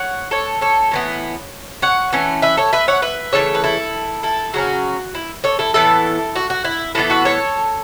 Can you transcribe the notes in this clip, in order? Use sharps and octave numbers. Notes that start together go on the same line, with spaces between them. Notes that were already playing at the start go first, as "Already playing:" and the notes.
Already playing: C#5 F#5
A4 C#5
A4 C#5
A2 E3 B3
C#5 F#5
E3 A3 C#4
B4 E5
A4 C#5
B4 E5
C#5 F#5
B4 E5
C#3 E3 A3 A4 C#5
B4
E4 A4
E4 A4
C#3 F#3 C#4 F#4
E4
A4 C#5
E4 A4
A2 E3 B3 E4 A4
F#4
F#4
E4
A2 E3 B3 E4 A4
F#4 B4
A4 C#5